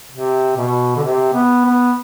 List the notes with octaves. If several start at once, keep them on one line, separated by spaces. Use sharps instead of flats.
C3
B2
D3
C3
B3
B3